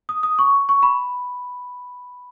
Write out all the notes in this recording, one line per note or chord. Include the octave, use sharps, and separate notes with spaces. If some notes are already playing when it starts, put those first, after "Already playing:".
D#6
D#6
C#6
C#6
B5